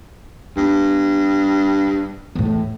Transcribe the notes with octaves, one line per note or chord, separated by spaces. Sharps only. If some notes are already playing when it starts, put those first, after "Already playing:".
G2 B3
E2 A2